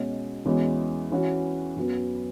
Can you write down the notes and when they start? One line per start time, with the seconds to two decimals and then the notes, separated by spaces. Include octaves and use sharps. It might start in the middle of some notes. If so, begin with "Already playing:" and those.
Already playing: B2 G#3 C#4 F#4
0.46 E2 E3 G#3 C#4 F#4
1.12 E3 C#4 F#4
1.76 F#2 F#3 B3